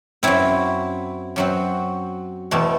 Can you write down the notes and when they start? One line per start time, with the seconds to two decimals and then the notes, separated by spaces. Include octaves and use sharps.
0.23 F#2 F#3 C4 E4
1.36 F#2 F#3 C4
2.51 E2 B2 A3 C4